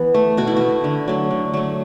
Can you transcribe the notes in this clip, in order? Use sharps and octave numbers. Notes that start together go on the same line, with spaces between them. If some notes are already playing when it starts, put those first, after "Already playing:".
Already playing: E3 B3
A3
B2 F#4
E4
A3 F#4
D3
F#3 A3
D3
F#3 A3